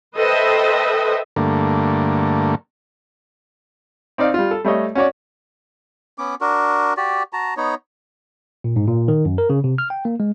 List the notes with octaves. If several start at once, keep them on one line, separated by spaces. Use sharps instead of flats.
A4 B4 C5 D#5 E5 G5
G2 D3 A3 A#3
C4 D#4 D5 F5
G3 F4
A4
G3 A3 C#5 D#5
C#4 F#4 C#5 D5
B3 C#4 D6
D4 F#4 A#4
F#4 G4 D5
F#4 A5 A#5
B3 D#4 C#5
A#2
G#2
A#2
D#3
F#2
A#4
C#3
C3
F6
G5
A#3
G#3